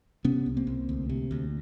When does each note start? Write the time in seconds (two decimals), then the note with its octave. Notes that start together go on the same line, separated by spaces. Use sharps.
0.24 C3 B3 C#4
0.46 C2
0.57 A#3 C4
0.67 C2
0.89 D2
1.09 C3
1.31 D2